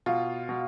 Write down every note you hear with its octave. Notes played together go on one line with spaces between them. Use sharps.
B2 F4
B2